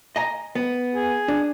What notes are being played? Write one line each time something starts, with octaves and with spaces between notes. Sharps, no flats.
D#5 G#5 A#5
B3
G#4
D4